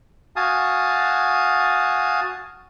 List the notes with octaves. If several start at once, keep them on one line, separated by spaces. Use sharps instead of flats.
F#4 F5 G#5 A5 D#6